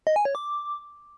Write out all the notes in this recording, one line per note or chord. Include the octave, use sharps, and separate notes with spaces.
D#5
G#5
C#5
D6